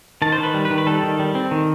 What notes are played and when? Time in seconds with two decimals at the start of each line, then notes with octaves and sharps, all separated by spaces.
0.22 D#3 A5
0.32 C5
0.38 D#3
0.43 B4
0.54 G3
0.65 B4
0.71 D#3
0.78 B4
0.87 G3 A4
1.03 D#3
1.19 G3
1.35 C4
1.51 D#3